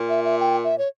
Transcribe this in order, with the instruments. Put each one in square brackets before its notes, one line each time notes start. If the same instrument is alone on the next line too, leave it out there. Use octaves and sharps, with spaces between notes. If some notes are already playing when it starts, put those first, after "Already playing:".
Already playing: [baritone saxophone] A#2
[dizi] E5
E5
G5
E5
C#5